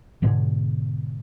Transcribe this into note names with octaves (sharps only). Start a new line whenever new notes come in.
G#2 B2 D3 G#3